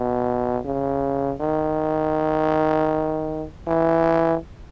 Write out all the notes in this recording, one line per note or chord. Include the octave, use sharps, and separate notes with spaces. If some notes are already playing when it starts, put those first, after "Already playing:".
Already playing: B2
C#3
D#3
E3